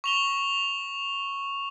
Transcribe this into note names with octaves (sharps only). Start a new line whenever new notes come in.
C#6 F7 G7